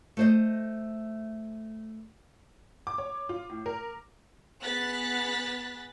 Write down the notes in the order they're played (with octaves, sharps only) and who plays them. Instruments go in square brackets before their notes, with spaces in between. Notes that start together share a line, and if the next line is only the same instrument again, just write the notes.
[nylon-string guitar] A3 C5 D#5
[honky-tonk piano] D6
C#5
F4
A2
A#4
[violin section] B3 G#4 F#6 A6 B6